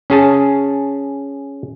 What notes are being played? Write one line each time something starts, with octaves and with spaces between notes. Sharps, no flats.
C#4 G#4 A5